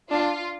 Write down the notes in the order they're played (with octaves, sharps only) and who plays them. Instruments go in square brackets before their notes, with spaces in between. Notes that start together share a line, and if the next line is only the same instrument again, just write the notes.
[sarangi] D4 [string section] F4